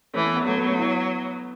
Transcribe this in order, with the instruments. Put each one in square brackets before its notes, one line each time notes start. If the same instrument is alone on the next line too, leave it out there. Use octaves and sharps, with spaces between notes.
[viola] E3 [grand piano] A3 C#4
[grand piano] B3
B3
[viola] F#3 [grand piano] A3
[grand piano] B3
A3 C#4
B3 E4